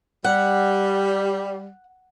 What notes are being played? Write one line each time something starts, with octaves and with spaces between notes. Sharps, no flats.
G3 F#5